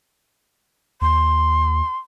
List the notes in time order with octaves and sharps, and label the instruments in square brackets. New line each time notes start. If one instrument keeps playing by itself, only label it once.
[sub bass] D#2 [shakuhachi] C6